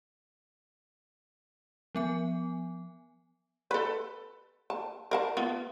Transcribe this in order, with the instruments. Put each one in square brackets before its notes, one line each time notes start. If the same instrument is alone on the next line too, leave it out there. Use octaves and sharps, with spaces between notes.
[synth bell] F3 B3 G#5
[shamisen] A4 B4
A5
A#4 F5 A5
B3 F4